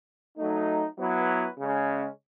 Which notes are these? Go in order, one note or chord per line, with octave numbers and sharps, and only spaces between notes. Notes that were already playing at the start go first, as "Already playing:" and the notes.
F#3 A3 D#4
F#3 B3 E4 B4
C#3 G#3 C#4